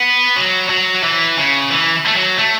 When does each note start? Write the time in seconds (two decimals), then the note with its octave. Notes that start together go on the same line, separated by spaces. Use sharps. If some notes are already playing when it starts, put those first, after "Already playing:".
Already playing: B3
0.36 F#3
0.69 F#3
1.03 E3
1.37 C#3
1.70 E3
2.07 A3
2.14 F#3
2.37 A3